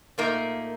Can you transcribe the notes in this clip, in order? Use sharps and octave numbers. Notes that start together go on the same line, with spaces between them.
A#2 A3 A#3 D#4 A#4